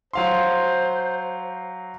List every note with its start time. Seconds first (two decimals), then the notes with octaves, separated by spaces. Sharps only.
0.13 F#3 C5 F5 C6